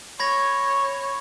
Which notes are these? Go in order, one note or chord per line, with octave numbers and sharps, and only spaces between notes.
C#5 B5 G#6 A#6